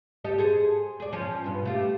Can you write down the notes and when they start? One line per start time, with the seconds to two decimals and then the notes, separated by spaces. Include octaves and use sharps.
0.24 G4 A4 D#5
0.38 G#4 A4 C5
1.00 G#4 D5
1.13 F3 C#4
1.44 G2 B2
1.65 A3 F4 G4